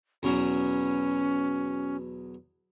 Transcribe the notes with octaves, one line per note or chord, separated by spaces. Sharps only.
E2 B2 F#3 C#4